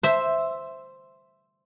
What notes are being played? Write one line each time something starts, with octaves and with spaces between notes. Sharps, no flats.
C5 E5